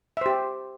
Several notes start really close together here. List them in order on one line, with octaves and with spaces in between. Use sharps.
E5 C5 G4